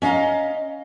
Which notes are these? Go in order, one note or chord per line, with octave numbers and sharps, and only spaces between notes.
C#4 D#5 F5 A#5